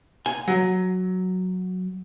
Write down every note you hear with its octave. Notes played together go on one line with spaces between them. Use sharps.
G#5
F#3